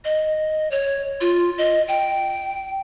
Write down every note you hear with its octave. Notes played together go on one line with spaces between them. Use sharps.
D#5
C#5
F4
D#5
G5